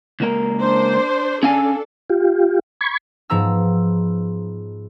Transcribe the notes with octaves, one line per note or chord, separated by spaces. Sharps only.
C#2 A#3 A#4
D4 C5
C#4 D4 A4 F5 G#5
F4 G4
B5 C#6 G#6
G#2 F3 B3 A#5 E6